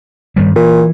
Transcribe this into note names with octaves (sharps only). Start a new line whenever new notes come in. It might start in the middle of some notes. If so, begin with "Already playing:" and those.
G2 D#3 G3
A#2 E3